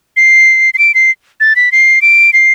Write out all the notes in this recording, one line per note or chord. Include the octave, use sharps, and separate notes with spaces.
C7
C7
D7
C7
A6
B6
C7
D7
C7